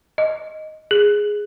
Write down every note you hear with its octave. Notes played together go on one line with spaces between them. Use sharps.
D#5
G#4